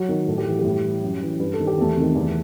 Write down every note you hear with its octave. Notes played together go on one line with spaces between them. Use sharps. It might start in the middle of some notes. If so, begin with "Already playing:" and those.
Already playing: F#3 F#4
D#3
A2 A4
G4
E3 F#4
G3 G4
A2
E3
F#2
E3
G2 B4
A4
D#3
G4
E2 A3 A4
C3 D#3
E2